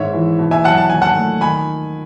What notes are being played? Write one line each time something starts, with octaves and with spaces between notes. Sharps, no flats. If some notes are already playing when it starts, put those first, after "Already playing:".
Already playing: G#2 D#3 C#5 E5
E3
B2
E5 G#5
F#3 F#5 A5
A5
D#3 G#5
F#5 A5
A3
D#3 G#5 B5